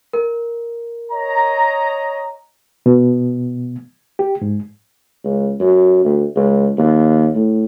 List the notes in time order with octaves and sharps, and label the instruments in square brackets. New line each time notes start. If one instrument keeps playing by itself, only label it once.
[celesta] A#4
[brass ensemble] C#5 D#5 A#5
[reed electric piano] B2
G4
G#2
[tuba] C#2
F#2
D2
C#2
D#2
A2